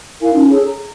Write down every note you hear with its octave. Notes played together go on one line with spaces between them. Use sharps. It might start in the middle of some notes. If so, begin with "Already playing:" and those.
E4 A#4 F5 G#5
C#4 D#4 F4
G#4 A4 C#5
A#5